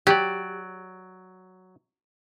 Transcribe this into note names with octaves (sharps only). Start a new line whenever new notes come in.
F#3 G4 D5